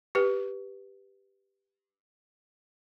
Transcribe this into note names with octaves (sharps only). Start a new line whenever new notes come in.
G4 B4